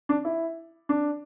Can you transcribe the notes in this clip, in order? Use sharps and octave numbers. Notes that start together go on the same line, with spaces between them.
D4
E4
D4